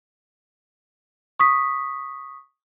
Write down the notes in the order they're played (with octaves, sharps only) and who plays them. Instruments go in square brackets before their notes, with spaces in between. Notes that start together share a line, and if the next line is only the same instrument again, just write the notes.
[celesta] C#6 D#6 B6